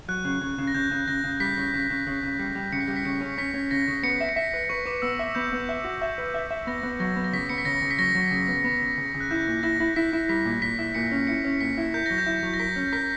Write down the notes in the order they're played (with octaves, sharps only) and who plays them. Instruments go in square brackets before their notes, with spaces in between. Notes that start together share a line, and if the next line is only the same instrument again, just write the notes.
[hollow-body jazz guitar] F#3 [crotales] F#6
[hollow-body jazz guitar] C#3
C#3
C#3
[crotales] A#6
[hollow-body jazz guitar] C#3 [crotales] G6
[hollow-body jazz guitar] C#3
[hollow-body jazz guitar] C#3 [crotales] A#6
[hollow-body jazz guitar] C#3
[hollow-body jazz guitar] G3 [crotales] B6
[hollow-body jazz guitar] C#3
C#3
C#3
C#3
C#3
G3
G3
[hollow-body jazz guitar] C#3 [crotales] C#7
[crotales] B6
[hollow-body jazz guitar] G3 [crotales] A#6
[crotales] B6
[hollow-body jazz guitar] C#3 [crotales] C#7
[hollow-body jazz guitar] C#4
[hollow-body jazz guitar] C#4 [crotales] B6
[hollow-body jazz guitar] C#4
[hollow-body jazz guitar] C#3 [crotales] A#6
[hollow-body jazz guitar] C#3
[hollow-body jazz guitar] B3 [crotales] C#7
[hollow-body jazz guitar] E5
[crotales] C#7
[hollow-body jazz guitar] E5 [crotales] B6
[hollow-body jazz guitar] B4
[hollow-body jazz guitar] B4 [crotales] C#6
[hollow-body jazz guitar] B4 [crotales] D6
[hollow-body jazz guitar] B3 [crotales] E6
[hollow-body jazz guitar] E5
[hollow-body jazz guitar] B3 [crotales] G6
[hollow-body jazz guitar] B3
E5
F#4
E5
B4
E5
E5
[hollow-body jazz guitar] B3 [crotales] A#6
[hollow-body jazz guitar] B3
[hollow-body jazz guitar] F#3 [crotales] A#6
[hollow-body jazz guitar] B3
[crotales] A#6
[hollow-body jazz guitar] C#3 [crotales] B6
[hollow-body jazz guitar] B3 [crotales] C#7
[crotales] B6
[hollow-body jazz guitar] C#3 [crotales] A#6
[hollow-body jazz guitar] C#3
[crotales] B6
[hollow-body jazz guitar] F#3 [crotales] A#6
[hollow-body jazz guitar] F#3
C#3
B3
B3
C#3
C#3
C#3
[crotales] F#6
[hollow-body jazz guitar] E4 [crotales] G6
[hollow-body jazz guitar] A#2
[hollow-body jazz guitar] E4 [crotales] A#6
[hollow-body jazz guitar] E4
[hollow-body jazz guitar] E4 [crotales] B6
[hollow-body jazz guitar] E4
[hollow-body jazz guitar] G3 [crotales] B6
[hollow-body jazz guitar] A#2
[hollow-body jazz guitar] A#2 [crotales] B6
[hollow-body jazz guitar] E4
[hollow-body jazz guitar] A#2 [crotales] C#7
[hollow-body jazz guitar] C#4
[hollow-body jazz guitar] E4 [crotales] C#7
[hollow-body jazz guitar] C#4
[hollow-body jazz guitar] A#2 [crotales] B6
[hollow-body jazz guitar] E4
[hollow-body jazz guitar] A#4 [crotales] G6
[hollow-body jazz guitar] F#3 [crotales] A#6
[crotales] G6
[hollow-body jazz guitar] E4
F#3
[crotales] A#6
[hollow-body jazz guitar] A#4 [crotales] B6
[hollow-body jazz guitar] C#4
[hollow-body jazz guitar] A#4 [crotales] B6